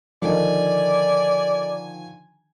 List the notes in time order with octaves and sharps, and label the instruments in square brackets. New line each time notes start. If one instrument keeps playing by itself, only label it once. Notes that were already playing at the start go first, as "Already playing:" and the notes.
[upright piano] D3 D#3 F3 [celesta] A4 A#4 D#5 [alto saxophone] D5 [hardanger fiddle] G#5